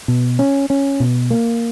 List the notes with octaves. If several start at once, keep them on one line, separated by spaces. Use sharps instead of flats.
B2
C#4
C#4
B2
A#3